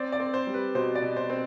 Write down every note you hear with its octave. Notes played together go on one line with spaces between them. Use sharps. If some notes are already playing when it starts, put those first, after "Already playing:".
Already playing: C4 D5
D5
C4
C5
G3
B4
B2 C5
D5
B2
C5
C4